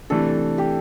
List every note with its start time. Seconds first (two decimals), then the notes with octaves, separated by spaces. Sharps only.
0.10 C3 E3 A3 D4 A4
0.58 G4